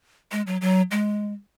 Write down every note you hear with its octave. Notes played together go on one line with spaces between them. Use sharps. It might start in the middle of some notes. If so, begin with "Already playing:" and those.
G#3
F#3
F#3
G#3